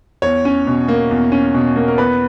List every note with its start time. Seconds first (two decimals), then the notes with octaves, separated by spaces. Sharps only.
0.22 E2 C#5
0.45 C#4
0.67 B2
0.88 A#3
1.11 E2
1.32 C#4
1.55 B2
1.76 A#3
1.88 A#4
1.98 E2 B4